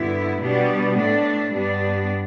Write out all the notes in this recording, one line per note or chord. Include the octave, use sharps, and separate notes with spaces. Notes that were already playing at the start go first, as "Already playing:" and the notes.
Already playing: G2 D3 B3 E4
B2 G3 B3 D4
A2 A3 D4
G2 G3 B3 D4